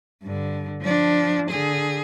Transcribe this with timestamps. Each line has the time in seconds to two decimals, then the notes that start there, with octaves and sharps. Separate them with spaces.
0.23 G2 D3
0.82 F3 D4
1.50 D3 G#4